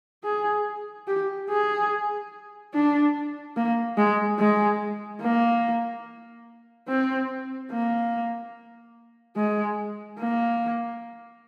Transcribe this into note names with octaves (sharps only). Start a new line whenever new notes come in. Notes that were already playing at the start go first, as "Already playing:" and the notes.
G#4
G4
G#4
D4
A#3
G#3
G#3
A#3
C4
A#3
G#3
A#3